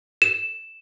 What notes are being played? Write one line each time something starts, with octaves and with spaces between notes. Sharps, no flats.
E7